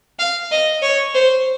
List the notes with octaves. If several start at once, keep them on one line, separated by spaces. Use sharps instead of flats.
F5
D#5
C#5
C5